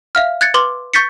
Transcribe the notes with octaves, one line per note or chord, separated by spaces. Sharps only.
E5 F5 F6
F#6 G#6 A6 C#7
B4 C6 D6 G7
C#6 G6 A6 B6 C#7